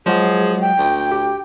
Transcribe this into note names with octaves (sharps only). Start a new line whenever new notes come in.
F3 F#3 G#3 F#4 G#4
G5
D2
G4